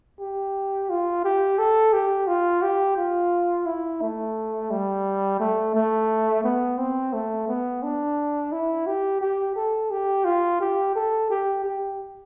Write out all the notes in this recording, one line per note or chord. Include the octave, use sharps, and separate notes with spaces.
G4
F4
G4
A4
G4
F4
G4
F4
E4
A3
G3
A3
A3
B3
C4
A3
B3
D4
E4
G4
G4
A4
G4
F4
G4
A4
G4
G4